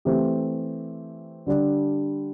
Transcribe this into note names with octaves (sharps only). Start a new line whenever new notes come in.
E3 A3 C4 G4
D3 G3 D4